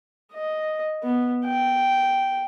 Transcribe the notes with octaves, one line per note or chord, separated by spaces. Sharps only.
D#5
B3
G5